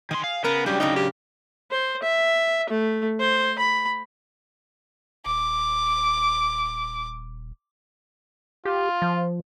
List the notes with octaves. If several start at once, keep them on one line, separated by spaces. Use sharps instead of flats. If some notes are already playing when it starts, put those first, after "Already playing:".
D#3 G#4 C6
F5
C#3 B3 A#4 B4 A#5
F#3 G3 D4 G4
C#3 D#4 A#4 G5
G4
C5
E5
A3
C5
B5
D#1 D6
F4 G4
F3